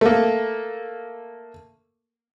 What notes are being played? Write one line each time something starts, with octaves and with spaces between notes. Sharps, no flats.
A3 A#3